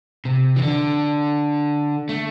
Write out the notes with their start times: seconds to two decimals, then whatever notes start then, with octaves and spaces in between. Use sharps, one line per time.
0.25 C3
0.56 E3
0.62 D3
2.09 A3